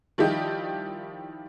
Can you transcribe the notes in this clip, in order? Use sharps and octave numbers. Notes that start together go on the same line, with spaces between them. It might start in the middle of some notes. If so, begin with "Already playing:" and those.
D#3 F3 G3 E4 G4 D#5